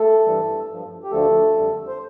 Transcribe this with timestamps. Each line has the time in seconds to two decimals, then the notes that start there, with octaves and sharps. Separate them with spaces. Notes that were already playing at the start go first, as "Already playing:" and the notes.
Already playing: A3 A4
0.25 G2 E3 G3
0.69 G2 F3
1.03 G4
1.11 D2 D3 F3 A3 A4
1.55 F2 D3 G3
1.88 C5